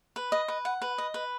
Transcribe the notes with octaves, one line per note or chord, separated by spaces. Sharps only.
B4
D#5
B4
F#5
B4
D#5
B4